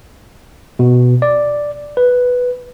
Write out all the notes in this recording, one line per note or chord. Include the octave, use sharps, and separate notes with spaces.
B2
D5
B4